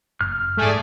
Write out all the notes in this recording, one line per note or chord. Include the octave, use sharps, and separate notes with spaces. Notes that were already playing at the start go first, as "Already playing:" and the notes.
F#1 F6
G#2 G#3 A3 G#4 D5